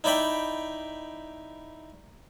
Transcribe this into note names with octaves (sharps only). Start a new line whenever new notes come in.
D#4 E4 D5 G5 B5